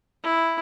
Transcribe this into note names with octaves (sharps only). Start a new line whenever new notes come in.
E4